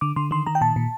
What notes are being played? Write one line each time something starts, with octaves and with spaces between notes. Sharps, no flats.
D3 D6
D3 C6
D#3 C6
D#3 A#5
G5
A#2 A5
A#2